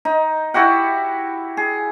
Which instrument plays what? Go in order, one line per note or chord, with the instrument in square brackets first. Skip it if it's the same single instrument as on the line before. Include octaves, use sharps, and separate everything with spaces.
[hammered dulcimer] D#4
E4 F#4 G4 F#5
G#4